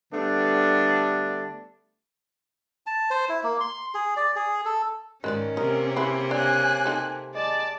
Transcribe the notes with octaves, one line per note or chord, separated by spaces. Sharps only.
D3 G3 A3 B3 D4
A5
C5
E4
A#3
C6
G#4
D5
G#4
A4
G#2 D#3 G#3 C#4 B4 D5
C3 A#3 A#4 D#5
E4 G#4 B4 C5
C#3 D4 G#5 F#6
C4 D#4 A4
G#3 D5 A5